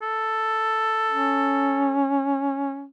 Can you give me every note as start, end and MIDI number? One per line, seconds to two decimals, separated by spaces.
0.02 2.01 69
1.10 2.86 61